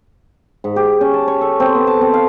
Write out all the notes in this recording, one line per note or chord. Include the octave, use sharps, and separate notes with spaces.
G#2
G4
C#4
A5
C#5
A4
C4
B3
A5
C4
F5